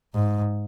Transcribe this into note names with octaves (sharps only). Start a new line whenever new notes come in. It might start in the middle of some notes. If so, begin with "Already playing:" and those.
G#2